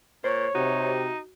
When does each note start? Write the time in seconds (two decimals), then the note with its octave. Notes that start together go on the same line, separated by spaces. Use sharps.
0.24 A#2 C5 C#5
0.55 C3 D#4 F#4